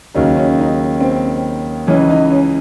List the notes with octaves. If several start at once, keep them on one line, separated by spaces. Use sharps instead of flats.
D#2 C#3 F#3 D#4
C#4
D#4
C4
C#2 C#3 E3 C#4
D#4
C#4